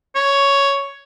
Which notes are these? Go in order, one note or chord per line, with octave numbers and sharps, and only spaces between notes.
C#5